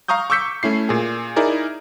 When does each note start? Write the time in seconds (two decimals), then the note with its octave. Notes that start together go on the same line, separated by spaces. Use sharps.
0.08 F5 A#5 C#6 D#6 G6
0.30 C#6 D6 E6 G6 B6 C#7
0.63 A3 C#4 E4 C7
0.89 A#2 G#4
1.36 D#4 E4 G#4 A#4 D5